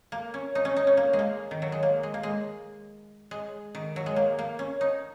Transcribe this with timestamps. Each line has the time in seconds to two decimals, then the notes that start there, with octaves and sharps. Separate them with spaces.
0.12 A#3
0.34 C#4
0.55 D#4
0.65 C#4
0.76 D#4
0.87 C#4
0.97 A#3
1.13 G#3
1.19 A#3
1.51 D#3
1.62 F#3
1.72 G#3
1.83 A#3
2.03 G#3
2.14 A#3
2.23 G#3
3.31 G#3
3.75 D#3
3.96 F#3
4.06 G#3
4.16 A#3
4.39 A#3
4.59 C#4
4.81 D#4